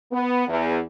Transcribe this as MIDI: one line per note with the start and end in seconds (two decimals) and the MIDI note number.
0.12 0.44 59
0.48 0.79 40